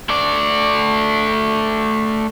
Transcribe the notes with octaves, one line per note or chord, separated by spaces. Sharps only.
A3 D5